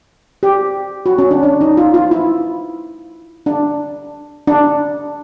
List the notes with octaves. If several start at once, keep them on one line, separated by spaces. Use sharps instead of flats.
G4
F#4
C#4
D4
D4
D#4
F4
F4
E4
D4
D4